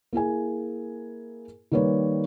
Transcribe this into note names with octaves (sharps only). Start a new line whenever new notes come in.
A#3 E4 G#4 G#5
D#3 G3 A#3 B4 C#5